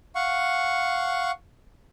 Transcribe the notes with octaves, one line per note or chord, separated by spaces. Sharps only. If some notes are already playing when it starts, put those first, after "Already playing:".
F5 F#5 C#6